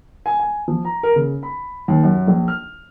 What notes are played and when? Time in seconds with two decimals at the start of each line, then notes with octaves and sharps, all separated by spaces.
0.26 G#5
0.40 G#5
0.68 F3
0.85 A#5
1.03 A#4
1.16 C#3
1.43 B5
1.88 D#2
2.03 F#2
2.27 A#1
2.48 F6